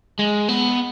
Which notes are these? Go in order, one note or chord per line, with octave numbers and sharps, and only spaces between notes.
G#3
B3